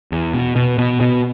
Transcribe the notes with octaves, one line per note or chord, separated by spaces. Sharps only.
E2
B2
B2
B2
B2